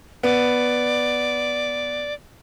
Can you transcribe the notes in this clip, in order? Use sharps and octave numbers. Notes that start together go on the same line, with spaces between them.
B3 D5